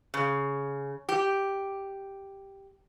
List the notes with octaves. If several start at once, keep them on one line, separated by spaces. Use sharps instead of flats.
C#3
G4